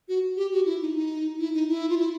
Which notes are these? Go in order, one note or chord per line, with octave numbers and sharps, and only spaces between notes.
F#4
G4
F#4
E4
D#4
D#4
E4
D#4
E4
F4
E4